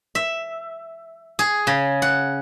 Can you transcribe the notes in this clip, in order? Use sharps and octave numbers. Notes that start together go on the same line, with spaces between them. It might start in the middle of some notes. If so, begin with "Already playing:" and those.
E5
G#4
C#3
F#5